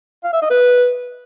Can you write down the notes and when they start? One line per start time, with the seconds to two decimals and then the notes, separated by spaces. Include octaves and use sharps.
0.24 F5
0.33 E5
0.42 D#5
0.50 B4